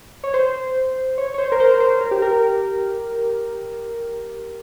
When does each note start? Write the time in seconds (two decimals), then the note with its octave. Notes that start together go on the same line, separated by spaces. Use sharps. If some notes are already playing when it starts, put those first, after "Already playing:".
0.24 C#5
0.34 C5
1.18 C#5
1.34 C#5
1.38 C5
1.52 A#4
1.60 C5
1.74 A#4
1.80 C5
2.01 A#4
2.11 G4
2.22 A#4